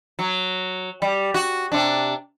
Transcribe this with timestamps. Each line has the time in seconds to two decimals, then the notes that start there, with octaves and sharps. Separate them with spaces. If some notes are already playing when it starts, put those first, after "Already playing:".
0.19 F#3
1.02 G3
1.34 F#4
1.72 C3 D4